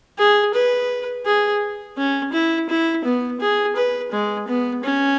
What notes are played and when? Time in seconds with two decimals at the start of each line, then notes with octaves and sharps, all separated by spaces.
0.19 G#4
0.54 B4
1.26 G#4
1.98 C#4
2.33 E4
2.70 E4
3.05 B3
3.41 G#4
3.76 B4
4.12 G#3
4.48 B3
4.84 C#4